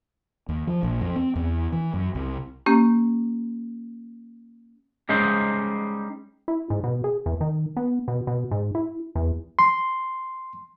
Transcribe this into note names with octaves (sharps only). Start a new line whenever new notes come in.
D#2
F3
A#1
F2
C4
E2
E3
F#2
C2
A#3 C#4 G4
G3 G#3 C#4 D#4 C5
E4
G#2
B2
G#4
E2
D#3
B3
B2
B2
G#2
E4
E2
C6